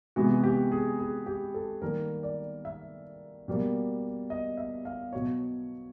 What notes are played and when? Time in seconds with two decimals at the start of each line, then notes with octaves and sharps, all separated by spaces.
0.16 C3 E3 G#3 B3 F#4
0.43 G4
0.71 G#4
0.99 G#4
1.26 G4
1.54 A4
1.82 D#3 G3 A#3 A#4
2.23 D5
2.65 E5
3.48 B2 G3 A#3
4.30 D#5
4.57 E5
4.85 F5
5.13 B2 F#3 B3 C#5